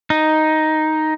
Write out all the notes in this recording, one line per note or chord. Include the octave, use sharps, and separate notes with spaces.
D#4